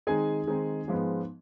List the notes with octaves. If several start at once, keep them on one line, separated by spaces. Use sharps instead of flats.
D#3 G#3 C4 D#4 G#4 G#5
D#3 G#3 C4 D#4
G#2 F3 G#3 B3